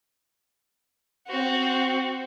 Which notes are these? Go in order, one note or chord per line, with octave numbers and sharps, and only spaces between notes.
C4 F#4